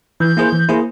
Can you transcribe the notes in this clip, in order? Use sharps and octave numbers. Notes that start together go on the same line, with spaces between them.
E3 G6
A#3 E4 G#4 C5
E3
A#3 E4 G#4 C5